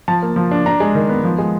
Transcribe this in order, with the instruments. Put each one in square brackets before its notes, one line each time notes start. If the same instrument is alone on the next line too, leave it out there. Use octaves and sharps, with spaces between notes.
[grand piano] F3 A5
A#3
F3
D4
D4 A#5
G#3
D#3
B3
F3
G#3